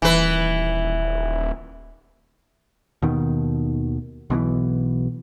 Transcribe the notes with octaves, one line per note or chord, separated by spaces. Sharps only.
D#1 E3 B4
D#2 B2 D#3
B1 B2 D3 E3